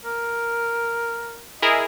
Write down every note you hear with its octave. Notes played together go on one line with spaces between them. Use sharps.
A#4
E4 G#4 A#4 D#5